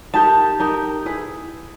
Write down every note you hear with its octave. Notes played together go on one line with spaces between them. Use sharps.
D#4 G4 A#4 A5
D#4 G4 A#4
E4 G#4 B4